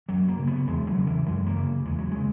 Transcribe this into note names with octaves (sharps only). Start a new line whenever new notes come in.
F#2 F#3
A#3
C#3
B3
E2 G#3
F#3
C#3
E3
F#2 G#3
A#3
C#3
E2 G#3
F#3
C#3 G#3